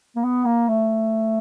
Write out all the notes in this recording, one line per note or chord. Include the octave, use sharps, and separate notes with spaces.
A#3
B3
A#3
A3